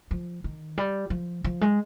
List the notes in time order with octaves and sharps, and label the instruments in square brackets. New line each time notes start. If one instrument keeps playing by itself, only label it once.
[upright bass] F3
D#3
G3
F3
F3
G#3